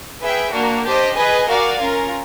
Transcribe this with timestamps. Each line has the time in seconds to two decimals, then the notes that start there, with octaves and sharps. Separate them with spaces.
0.21 G#4 B4 E5 G5
0.52 A#3 D4 F#4 A#4
0.84 D4 G4 C5 D#5
1.16 G#4 B4 D#5 G#5
1.47 F#4 A#4 D5 F5 G#5
1.79 C#4 F4 A#4